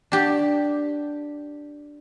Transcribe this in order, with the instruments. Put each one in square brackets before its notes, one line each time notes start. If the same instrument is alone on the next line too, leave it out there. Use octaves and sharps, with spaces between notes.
[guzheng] D4 G4